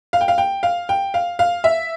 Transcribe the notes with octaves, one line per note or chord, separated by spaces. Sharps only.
F5
G5
F5
G5
F5
G5
F5
F5
E5